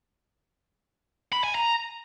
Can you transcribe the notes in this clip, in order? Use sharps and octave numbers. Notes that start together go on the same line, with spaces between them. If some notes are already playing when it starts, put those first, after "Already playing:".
B5
G#5
A#5